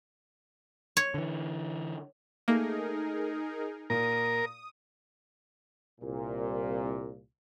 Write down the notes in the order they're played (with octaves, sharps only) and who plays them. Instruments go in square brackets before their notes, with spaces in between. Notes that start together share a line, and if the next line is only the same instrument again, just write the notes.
[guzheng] C#5
[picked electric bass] D3 E3
[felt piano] A3 [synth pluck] A#3 [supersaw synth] D#4 G#4 A#4
[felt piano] A#2 [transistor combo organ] A#4 [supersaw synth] D#6
[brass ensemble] C2 A#2